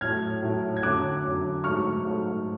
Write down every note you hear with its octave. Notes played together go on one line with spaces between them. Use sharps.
A2 F#3 A3 F6 G#6
A2 F#3 A3
G#6
F#2 D3 F#3 D6 F#6
F#2 D3 F#3
G#2 F#3 A3 C#6 F6
G#2 F#3 A3